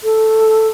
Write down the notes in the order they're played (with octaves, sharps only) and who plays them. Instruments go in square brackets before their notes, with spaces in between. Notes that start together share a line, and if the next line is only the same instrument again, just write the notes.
[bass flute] A4